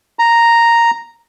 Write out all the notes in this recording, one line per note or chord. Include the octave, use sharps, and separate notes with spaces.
A#5